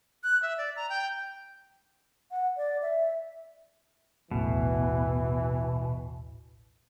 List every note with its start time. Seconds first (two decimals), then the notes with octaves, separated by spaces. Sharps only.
0.24 F#6
0.43 E5
0.58 D5
0.76 A#5
0.89 G5
2.31 F#5
2.57 D5
2.82 E5
4.31 D#1 A1 B2 E3 A3